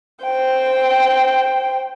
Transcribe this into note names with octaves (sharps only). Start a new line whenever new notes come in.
C5 G5